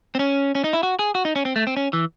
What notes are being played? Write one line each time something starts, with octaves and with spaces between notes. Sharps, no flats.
C4
C#4
C#4
D#4
E4
F#4
G#4
F#4
D#4
C#4
C4
A3
C4
C#4
E3